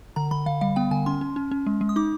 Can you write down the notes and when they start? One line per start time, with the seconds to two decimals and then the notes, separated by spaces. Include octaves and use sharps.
0.16 D3 A#5
0.31 D3 B5
0.46 D3 F5
0.61 G3 F5
0.76 B3 G5
0.91 D3 G#5
1.06 C#4 C6
1.21 C#4
1.36 C#4
1.51 C#4
1.66 G#3
1.81 G#3
1.89 D#6
1.96 D#4 D6